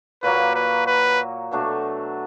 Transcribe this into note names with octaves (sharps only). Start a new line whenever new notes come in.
A#2 F#3 A#3 B4
B4
B4
B2 F#3 A3 D4